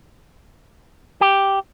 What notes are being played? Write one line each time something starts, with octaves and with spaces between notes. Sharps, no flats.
G4